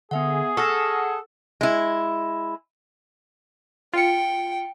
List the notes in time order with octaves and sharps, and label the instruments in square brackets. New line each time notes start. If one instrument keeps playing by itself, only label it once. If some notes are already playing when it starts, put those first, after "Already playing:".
[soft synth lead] D3 [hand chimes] B3 E5 F#5 [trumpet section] G#4
[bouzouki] A4 [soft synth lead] F#5 [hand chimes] C#6 F6 A#6
[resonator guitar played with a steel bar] G#3 E4
[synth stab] F4 C#7 [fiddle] G5